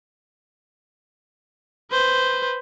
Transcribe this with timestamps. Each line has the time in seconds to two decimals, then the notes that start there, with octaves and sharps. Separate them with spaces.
1.91 B4 C5